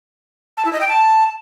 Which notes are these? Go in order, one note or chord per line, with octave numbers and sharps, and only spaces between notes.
A5
E4
D#5
G5
A5